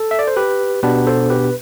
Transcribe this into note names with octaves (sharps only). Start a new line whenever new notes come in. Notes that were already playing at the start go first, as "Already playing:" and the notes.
Already playing: A4
E5
D5
C5
G4 B4
B2 B3 D4 G4 B4
A4 C5
G4 B4